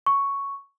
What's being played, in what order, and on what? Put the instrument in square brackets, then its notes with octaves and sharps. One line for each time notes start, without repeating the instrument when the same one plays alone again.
[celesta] C#6